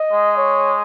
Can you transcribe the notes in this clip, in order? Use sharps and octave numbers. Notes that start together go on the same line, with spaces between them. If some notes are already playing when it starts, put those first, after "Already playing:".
Already playing: D#5
G#3
C#5